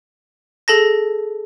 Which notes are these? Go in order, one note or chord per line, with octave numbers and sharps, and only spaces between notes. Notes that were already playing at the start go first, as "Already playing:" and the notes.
G#4 A4 A5 A#6